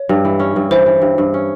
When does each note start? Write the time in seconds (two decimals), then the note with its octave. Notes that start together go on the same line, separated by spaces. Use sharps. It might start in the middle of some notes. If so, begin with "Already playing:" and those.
Already playing: C#5
0.09 G2
0.25 E3
0.39 C#4
0.56 G2
0.71 E3 C5
0.86 E3
1.02 G2
1.18 G2
1.34 C#4